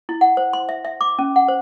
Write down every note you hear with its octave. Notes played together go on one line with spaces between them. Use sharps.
E4
F#5
C5
C6
E5
E5
D6
C#4
F#5
C5